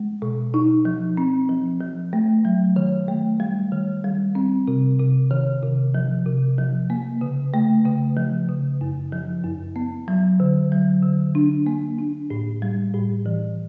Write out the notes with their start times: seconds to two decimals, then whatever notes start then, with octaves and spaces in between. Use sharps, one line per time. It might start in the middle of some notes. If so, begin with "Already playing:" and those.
Already playing: G#3
0.22 B2
0.54 D#4
0.85 F3
1.17 C4
1.49 F3
1.81 F3
2.13 A3
2.45 F#3
2.76 D#3
3.08 A3
3.40 G3
3.72 D#3
4.04 G3
4.35 C4
4.68 C3
4.99 C3
5.31 D#3
5.63 C3
5.95 F3
6.26 C3
6.58 F3
6.90 A#3
7.21 C#3
7.54 A3
7.85 C#3
8.17 F3
8.49 C#3
8.81 F#2
9.12 F3
9.44 F#2
9.76 B3
10.08 F#3
10.40 D3
10.72 F#3
11.03 D3
11.35 D4
11.67 A#3
11.99 D4
12.30 A2
12.62 G3
12.94 A2
13.26 E3